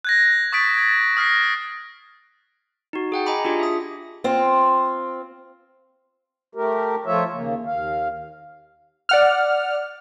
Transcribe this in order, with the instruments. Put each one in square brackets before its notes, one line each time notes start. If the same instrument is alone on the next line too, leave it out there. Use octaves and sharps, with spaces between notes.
[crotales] F#6 G#6 A#6
C#6 D#6 A6 B6 D7
G#6 A6
D#6 F6 A#6 C7
[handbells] D#4 F#4
G#4 F#5 G5
D#5 G#5 A#5 B5 D6
D4 F4 G4 G#4
E5 D#6
[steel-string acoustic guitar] C4 F4
[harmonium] A3 G4 A#4
F3 A3 F4 C#5 E5
D#2 C#3 A#3
D#2 F5
[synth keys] D5 F#5 F6